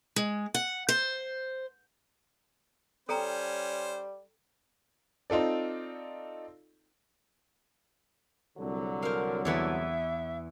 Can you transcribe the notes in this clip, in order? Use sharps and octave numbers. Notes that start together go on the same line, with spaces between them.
G#3
F#5
C5
G3 C#4 A4 C5 G5 A#5
C4 D#4 F4 A4 D5
C2 D3 F#3
A#4 C5 F5
E2 E3 B3 E5